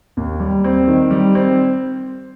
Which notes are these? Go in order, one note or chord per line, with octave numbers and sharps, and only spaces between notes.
D#2
G3
C4
D#3
G3
C4